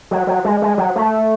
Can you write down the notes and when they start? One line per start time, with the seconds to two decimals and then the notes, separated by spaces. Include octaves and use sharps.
0.11 F#3
0.27 F#3
0.45 G#3
0.62 G#3
0.78 F#3
0.96 A3